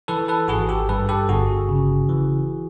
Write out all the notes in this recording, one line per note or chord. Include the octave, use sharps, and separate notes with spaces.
E3 A4 B4
A4 B4
G#1 F#4 G#4
G4 A4
G2 A4 B4
G4 A4
G1 F#4 G#4
C#3
E3